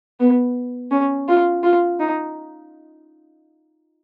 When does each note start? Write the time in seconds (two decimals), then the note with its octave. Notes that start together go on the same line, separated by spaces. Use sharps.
0.20 B3
0.91 C#4
1.28 F4
1.64 F4
2.00 D#4